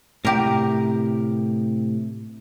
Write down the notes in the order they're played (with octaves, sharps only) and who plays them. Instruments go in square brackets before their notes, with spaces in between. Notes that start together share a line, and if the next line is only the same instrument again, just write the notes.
[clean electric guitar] A2 C3 [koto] G4 A#4